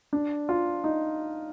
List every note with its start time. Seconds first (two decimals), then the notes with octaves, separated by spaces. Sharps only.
0.13 D4
0.49 F4
0.84 D#4